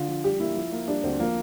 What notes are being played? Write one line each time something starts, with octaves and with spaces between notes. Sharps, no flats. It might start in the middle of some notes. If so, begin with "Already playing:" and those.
Already playing: D3 F4
F3
G3 G4
A#3 E4
F3
A#3
G3 D4
D2 C4
F3 A#3